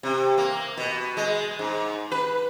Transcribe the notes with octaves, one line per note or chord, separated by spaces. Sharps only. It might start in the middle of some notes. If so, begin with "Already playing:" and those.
C3
A#3
B2
G#3
G#2
B4